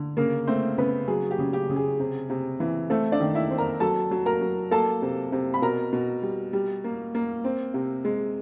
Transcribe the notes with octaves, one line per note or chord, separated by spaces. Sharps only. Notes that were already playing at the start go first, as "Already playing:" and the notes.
Already playing: D3
C#3 A#3 A#4
A3 C4 C5
C#3 B3 B4
F#3 G#4
G4
C#3
G4
C#3
G#4
C3
C3
E3
A3 C4 A4
D4 D5
D#3
E4 E5
C4
A#4 A#5
F#3 A4 A5
F#3
A#4 A#5
F#3
A#3 A4 A5
C3
C3
B5
B2 A#4 A#5
B2
G3
G3
A#3
A#3
C4
C3
G#3